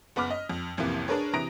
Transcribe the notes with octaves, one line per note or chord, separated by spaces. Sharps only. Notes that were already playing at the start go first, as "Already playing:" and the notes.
F#1 B3 B5 D6 F6 B6
D#5
F2
A1 F2 C3 E3 A#3
D4 G#4 A#4 B4 C#5
C3 E3 A#5 D#6 A#6 D7